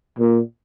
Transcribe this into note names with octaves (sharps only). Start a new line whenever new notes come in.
A#2